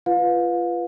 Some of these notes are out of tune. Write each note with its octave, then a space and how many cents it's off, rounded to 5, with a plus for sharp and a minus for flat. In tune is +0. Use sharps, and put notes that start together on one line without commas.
F4 -20 B4 +0 F5 +30